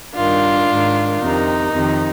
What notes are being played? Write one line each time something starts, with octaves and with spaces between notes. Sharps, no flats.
G2 D#3 D4 F4
G#2 D#3
F2 C3 D#3 D#4
F2 C3 D#3